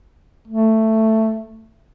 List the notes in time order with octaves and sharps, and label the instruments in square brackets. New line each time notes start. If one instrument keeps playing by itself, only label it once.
[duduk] A3